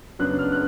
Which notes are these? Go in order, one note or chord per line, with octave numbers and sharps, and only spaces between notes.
F#2 C#3 F#3 B3 D4 F#6
F6
F#6